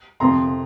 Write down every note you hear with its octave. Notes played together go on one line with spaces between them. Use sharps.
F2 C3 F3 A#5 C6